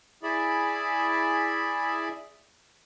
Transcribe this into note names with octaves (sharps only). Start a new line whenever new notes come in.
E4 G#4 D5 E5 B5